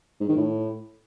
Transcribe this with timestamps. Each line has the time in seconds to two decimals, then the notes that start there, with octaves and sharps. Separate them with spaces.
0.20 G#2
0.28 D#3
0.37 A2